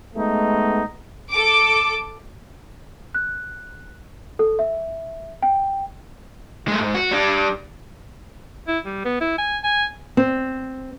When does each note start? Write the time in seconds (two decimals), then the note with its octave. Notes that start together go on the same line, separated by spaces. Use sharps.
0.15 G#3 A3 B3 D#4
1.31 A4 D6 D7
3.15 F#6
4.39 A4
4.59 E5
5.43 G5
6.68 G#3 A3
6.80 G#2
6.95 F#4
7.11 G3 D4
8.67 E4
8.85 G3
9.05 B3
9.21 E4
9.38 G#5
9.64 G#5
10.17 C4